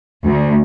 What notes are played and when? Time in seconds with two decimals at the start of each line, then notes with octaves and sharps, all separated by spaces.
0.24 D2